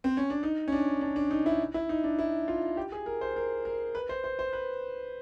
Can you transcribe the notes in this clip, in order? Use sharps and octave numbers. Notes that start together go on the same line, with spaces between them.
C4
C#4
D4
D#4
C#4
D4
D4
D4
D#4
E4
E4
D#4
D4
E4
F4
G4
G#4
A#4
C5
A#4
A#4
B4
C5
C5
C5
B4